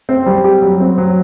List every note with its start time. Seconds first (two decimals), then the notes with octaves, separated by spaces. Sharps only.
0.09 C4
0.26 G3
0.44 G4
0.62 F#3
0.80 C4
0.98 F#3